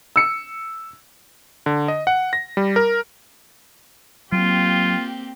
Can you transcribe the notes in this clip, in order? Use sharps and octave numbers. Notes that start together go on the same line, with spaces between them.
E6 C#7
D3
D#5
F#5
A#6
G3
A#4
F#3 A#3 C4 F4 G4